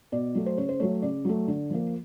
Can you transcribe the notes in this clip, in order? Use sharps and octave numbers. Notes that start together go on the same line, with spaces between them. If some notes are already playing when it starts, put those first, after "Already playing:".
B2 D5
F#3 A3
C5
C#3 C#5
C5
F#3 A3 C#5
C#3 D5
F#3 A3
D3
F3 A#3